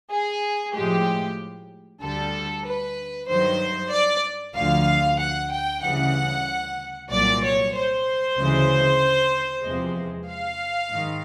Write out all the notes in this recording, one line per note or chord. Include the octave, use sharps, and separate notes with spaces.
G#4
A2 F3 G#3 G4
D2 D3 G3 A4
B4
G2 D#3 F#3 C5
D5
D2 D3 F3 F5
F#5
G5
D2 C#3 E3 G3 F#5
C2 A#2 F#3 D5
C#5
C5
D2 C#3 E3 G#3
E2 C3 F3 G#3
F5
G#2 D#3